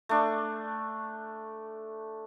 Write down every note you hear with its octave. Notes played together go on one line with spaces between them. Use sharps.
A3 D4 C#6